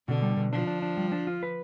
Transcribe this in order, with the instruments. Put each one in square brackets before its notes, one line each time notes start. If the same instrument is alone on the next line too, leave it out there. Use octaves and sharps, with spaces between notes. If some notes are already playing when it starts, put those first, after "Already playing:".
[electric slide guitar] B2 [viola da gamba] D3
[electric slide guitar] G3
B2
[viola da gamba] F3 [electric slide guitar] D4
[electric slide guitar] D4
D4
G3
D4
F4
B4